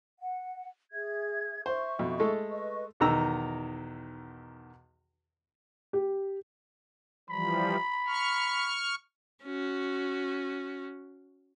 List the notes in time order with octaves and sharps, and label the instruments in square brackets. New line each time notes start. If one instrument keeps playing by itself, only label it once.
[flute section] F#5
G#4 E5 G#6
[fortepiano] C5 [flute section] E5 C#6
[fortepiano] F2 B2
G#3 A3 A4
[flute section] B4 D#5 C#6
[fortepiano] B1 E2 D#3 A#5 E6
[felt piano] G4
[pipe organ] E3 F3 G3 [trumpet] B5
[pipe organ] C#6 F6
[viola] C#4 F#4